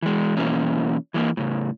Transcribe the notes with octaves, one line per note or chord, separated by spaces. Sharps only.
E3 G#3
B2 E3 A#3 C#4
E3 G#3 A#3
A2 C#3